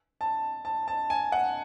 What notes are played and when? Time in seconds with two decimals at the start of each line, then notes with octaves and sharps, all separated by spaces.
0.21 A5
0.65 A5
0.88 A5
1.10 G#5
1.32 F#5